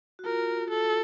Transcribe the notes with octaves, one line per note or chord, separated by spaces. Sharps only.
F#4
F4 A#4
A4